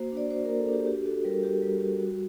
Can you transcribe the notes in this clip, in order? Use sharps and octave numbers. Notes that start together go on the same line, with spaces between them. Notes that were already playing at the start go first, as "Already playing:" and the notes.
Already playing: A#3 F#4 C5
D4 D5
F#4 C5
A#4
A#3
A4
D4 G4
F#4 G4
F#4 A4
G3 A#4
F#4 G4
G3
F#4
F#4